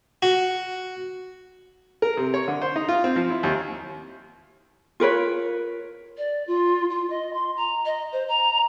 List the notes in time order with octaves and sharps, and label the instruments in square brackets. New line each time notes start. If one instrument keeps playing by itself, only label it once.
[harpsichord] F#4
[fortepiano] A#4
C3
C#5
D3
C5
D#4
F4
C4
F3
E4
D#2
[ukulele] F4 A#4 B4 C#5
[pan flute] D5
F4
F4
D#5
C6
A#5
D#5
C5
A#5